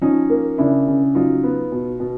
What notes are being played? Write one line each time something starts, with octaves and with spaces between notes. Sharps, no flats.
F3 C#4 D#4
A#3
C#3 D4 E4
C#3
F#3 D#4 F4
B3
B2
B2